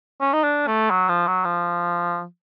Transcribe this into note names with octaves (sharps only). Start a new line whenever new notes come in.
C#4
D#4
D4
A3
F#3
F3
F#3
F3